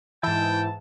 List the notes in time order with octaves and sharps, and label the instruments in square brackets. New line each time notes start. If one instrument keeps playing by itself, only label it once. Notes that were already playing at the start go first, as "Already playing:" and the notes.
[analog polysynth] G#2 E3 [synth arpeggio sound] E4 [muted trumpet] G5 [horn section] A5